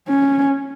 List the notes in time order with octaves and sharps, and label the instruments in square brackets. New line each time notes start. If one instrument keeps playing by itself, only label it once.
[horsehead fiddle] C#4